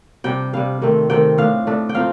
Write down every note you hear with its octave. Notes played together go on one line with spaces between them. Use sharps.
C3 G3 D4 G5
C3 G3 D4 F5
C3 D#3 A3 C4
C3 D#3 A3 C4 G5
A2 A3 D4 F5
A2 A3 D4
G5
F3 C4 D#4 F5